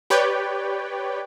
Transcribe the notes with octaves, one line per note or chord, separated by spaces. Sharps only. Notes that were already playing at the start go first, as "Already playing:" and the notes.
G4 B4 C#5 D5 G5